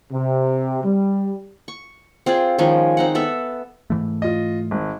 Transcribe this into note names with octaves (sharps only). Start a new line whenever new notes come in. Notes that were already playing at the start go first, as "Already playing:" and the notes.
C3
G3
C#6
C4 F4 G#4 D5
D#3 F3 G#3 C#4
C4 D#4 F#5
B3 A4 E5
G#2 E3 A3
F4 D#5
G#1